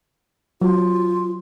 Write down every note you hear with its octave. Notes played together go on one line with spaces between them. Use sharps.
F#3 F4